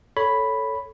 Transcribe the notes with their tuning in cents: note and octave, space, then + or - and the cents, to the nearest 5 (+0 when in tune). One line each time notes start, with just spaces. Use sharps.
A4 +0 C#5 +5 B5 +0